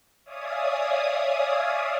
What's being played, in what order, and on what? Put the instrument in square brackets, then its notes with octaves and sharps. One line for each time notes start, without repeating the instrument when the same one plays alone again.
[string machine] C#5 D5 E5 F5 G#5 D#6